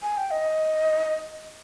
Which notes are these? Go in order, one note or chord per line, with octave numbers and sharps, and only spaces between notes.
G#5
G5
D#5